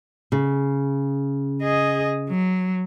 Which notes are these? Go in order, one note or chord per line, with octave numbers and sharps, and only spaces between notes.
C#3
G#4 D#5
F#3